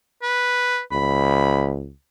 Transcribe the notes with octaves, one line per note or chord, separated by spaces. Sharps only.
B4
C#2 B5